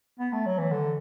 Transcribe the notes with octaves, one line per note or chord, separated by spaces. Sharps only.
B3
A3
F#3
E3
D3